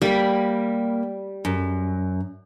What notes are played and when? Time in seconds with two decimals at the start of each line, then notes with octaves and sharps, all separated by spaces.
0.02 G3 A#3 B5
1.45 F#2